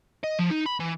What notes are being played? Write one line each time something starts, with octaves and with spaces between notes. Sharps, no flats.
D#5
F3
D#4
B5
E3